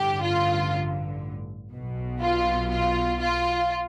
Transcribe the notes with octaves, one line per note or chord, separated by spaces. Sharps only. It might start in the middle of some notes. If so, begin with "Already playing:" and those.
Already playing: A1 G2 D3 G4
F4
B1 B2
F4
F4
F4